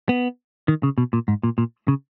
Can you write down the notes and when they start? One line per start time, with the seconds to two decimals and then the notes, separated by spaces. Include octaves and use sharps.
0.09 B3
0.68 D#3
0.83 C#3
0.98 B2
1.13 A#2
1.28 G#2
1.43 A#2
1.58 A#2
1.88 C#3